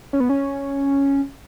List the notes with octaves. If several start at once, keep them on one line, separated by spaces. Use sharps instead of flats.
C#4
B3
C#4